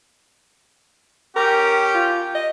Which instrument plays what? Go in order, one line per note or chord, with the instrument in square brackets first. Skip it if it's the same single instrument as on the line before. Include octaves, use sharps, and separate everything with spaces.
[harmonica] C#4 G4 [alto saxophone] A#4
[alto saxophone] F4
D#5